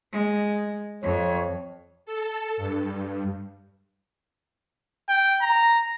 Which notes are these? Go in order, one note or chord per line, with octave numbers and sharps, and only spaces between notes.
G#3
F2 C#5
A4
G2
G5
A#5